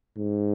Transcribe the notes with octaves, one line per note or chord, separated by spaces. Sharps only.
G#2